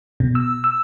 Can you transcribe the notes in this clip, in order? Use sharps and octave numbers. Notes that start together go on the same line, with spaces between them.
B2
E6
E6